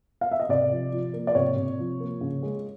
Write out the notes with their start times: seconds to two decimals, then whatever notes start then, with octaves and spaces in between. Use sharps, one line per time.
0.21 F5
0.31 E5
0.40 D#5
0.49 C3 D5
0.71 F3
0.92 F3
1.13 A#3
1.27 D5
1.35 C3 C#5
1.56 C3
1.79 F3
2.00 A#3
2.21 C#3
2.43 G#3